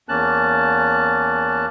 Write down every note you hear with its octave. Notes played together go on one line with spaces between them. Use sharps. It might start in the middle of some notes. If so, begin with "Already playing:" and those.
E2 A#3 C#4 A5 F#6